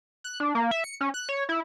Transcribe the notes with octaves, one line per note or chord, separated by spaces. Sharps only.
F#6
D4
A#3
E5
C#7
C#4
F#6
C#5
E4